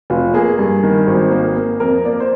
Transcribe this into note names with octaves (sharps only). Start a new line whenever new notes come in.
F1 F4
A#3 G#4
G2
D#3
G#1
A#3
A#3
F2 A#4
A#3 D5
C5